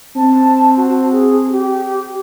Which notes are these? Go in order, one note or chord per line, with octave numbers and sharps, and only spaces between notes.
C4 A5
F#4
G#4
G4